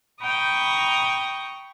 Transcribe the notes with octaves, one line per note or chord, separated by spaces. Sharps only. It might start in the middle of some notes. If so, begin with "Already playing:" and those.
G5 A#5 B5 C#6 D#6